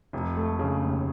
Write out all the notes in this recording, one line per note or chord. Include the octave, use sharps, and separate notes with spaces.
F1
A3
C#3
D#2